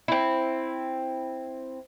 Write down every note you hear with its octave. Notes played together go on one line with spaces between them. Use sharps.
C4 E4